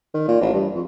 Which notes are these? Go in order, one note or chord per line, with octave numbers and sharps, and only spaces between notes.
D#3
A#2
A1
G2
F2